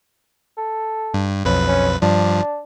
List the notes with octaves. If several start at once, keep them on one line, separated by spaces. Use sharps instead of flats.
A4
G2
B1 F2 C#4 B4
C#4
G2 F3 D4